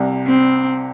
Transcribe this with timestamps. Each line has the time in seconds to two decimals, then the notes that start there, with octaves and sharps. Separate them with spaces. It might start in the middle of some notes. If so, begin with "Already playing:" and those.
Already playing: C2 C3 G3
0.26 C4